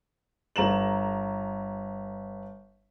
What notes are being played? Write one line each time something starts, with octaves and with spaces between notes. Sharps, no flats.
G1 A#5 E7 F#7